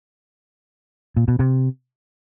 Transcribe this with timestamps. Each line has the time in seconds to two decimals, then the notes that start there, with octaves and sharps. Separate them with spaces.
1.17 A#2
1.28 B2
1.39 C3